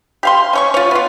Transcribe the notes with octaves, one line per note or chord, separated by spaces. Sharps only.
G4 F5 C6
C#4 C#5 C#6
F4 C#5
B3 F4